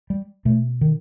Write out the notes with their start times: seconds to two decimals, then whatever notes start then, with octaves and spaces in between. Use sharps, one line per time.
0.10 G3
0.45 B2 A3
0.81 D#3